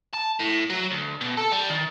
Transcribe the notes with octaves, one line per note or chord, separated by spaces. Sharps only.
A5
A2
F#3
D2
B2
A4
G3
D#3